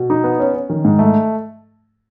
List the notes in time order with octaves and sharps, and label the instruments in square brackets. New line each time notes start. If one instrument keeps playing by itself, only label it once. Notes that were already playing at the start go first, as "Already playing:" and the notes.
Already playing: [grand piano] B2
D#4
B3
C#4
C#4
D#3
G#2
A3